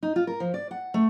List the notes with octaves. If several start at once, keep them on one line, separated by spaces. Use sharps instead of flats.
D#4
F4
A#4
F3
D5
F#5
A3